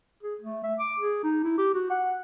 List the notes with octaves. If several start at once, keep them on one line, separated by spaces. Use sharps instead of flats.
G#4
A3
E5
D6
G#4
D#4
E4
G4
F#4
F#5